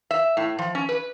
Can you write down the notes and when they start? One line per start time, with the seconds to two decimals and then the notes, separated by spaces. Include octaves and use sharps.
0.11 E5
0.37 A2
0.59 F3
0.75 C#4
0.89 B4